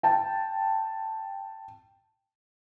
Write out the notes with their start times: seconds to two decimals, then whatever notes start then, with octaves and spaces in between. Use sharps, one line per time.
0.03 G5 A5